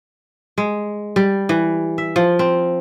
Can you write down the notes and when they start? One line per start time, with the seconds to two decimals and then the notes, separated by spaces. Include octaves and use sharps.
0.58 G#3
1.16 G3
1.49 E3
1.98 E5
2.16 F3
2.39 C4